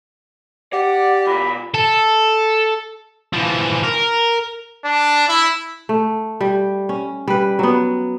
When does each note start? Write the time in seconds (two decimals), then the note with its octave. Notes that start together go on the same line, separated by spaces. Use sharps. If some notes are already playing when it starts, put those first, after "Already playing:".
0.73 G4 D5 F#5
1.27 B2 F4 B5
1.74 A4
3.33 E3 F3
3.83 A#4
4.84 D4
5.28 E4
5.89 A3
6.41 G3
6.89 C#4
7.28 G3 B4
7.59 F#3 B3